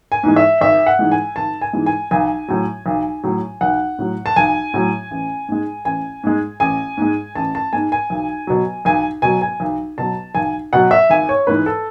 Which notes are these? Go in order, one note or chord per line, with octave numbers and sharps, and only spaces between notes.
G#5
G#2 E3 G#3
E5
G#1 E5
F#5
G#2 E3 G#3
G#5
G#1 A5
G#5
G#2 E3 G#3
G#5
B1 G#5
A2 F#3
B1
A2 F#3
B1 F#5
A2 F#3
A5
B1 G#5
A2 F#3
A1
G#2 G#3
A1 G#5
G#2 G#3
A1 G#5
G#2 G#3
A1 A5
A5
G#2 G#3 G#5
G#5
B1
B2 F#3
B1 G#5
B2 F#3 G#5
G#5
B1
B2 F#3 A5
B1 G#5
B2 F#3 F#5
E5
G#1 G#5
C#5
G#2 E3 G#3 B4
A4